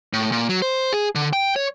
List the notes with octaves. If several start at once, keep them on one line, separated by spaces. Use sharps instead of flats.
A2
A#2
F#3
C5
G#4
D3
G5
C#5